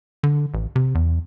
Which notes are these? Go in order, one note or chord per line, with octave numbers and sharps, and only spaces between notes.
D3
A1
C3
E2